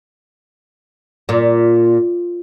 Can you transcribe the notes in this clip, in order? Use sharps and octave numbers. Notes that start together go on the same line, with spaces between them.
A#2